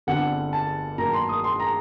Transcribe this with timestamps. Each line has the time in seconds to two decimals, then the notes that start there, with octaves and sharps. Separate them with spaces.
0.07 G1 G2 D3 G3 C4 F#5
0.53 A5
0.98 G2 D#3 F#3 A#3 A#5
1.14 C6
1.29 D#6
1.44 C6
1.60 A#5